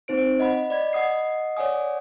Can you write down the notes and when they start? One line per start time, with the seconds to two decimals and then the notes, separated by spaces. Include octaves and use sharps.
0.08 C4 D#4 C5 D7
0.40 D#5 F#5 B5
0.70 D5 D#5 B5 G#6
0.93 D#5 F#5 D#6 C7
1.57 C#5 D5 F#5 G#5 D#6